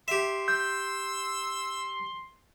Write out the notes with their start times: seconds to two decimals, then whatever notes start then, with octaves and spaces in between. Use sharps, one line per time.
0.08 G4 E5 C6
0.48 E6 G6